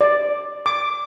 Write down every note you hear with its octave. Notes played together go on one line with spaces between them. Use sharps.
D5
D6